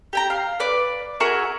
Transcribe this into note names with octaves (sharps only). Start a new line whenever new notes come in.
G4 G5 A#5
F5
B4 D5 D6
F#4 G#4 A#4 E5